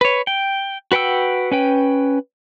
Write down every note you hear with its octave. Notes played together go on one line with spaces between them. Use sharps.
B4 C#5
G5
F#4 B4 F#5 G5 E6
C#4 B4 G5